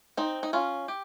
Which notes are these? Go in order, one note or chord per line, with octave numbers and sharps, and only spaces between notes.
C4 D#4
D#4
C#4 F4
G4